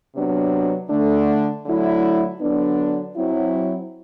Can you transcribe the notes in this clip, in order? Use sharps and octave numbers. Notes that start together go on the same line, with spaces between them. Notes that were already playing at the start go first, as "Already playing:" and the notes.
C3 F#3 B3 D4
D3 A3 D4
D3 F#3 A3 E4
D3 F#3 B3 D4
F#3 C4 E4